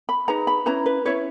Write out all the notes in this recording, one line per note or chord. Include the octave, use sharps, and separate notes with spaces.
B5
D#4 G#4 B4 A#5
B5
C#4 E4 B4 A#5
B4
C#4 E4 B4 C#5